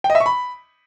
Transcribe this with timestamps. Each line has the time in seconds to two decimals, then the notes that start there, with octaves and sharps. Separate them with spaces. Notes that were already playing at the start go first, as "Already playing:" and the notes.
0.04 G5
0.10 D#5
0.15 E5
0.20 C#6
0.26 B5